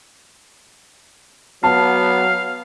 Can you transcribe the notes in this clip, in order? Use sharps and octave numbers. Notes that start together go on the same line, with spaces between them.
F#3 B3 F5 A5